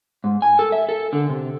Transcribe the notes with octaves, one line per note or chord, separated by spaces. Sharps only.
G#2
G#5
A4
E5
A4
D3
C3